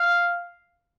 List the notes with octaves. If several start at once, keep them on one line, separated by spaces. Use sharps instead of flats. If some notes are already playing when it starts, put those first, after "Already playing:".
Already playing: F5